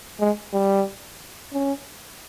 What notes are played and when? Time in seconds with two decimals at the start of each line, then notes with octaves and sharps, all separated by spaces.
0.20 G#3
0.53 G3
1.53 C#4